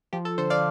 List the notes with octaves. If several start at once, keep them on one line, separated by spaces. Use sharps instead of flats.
F3 G4
A4
D3 A4 C5
D5 F5